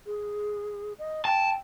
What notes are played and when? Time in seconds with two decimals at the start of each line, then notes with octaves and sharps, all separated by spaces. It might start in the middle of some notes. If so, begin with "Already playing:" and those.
0.06 G#4
0.98 D#5
1.25 G5 A5